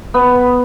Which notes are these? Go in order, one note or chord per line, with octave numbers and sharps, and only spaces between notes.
B3